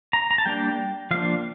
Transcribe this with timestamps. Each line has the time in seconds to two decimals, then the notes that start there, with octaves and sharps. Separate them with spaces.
0.13 A#5
0.31 A#5
0.38 A5
0.46 G3 A#3 D4 G5
1.11 F3 A#3 D4 F5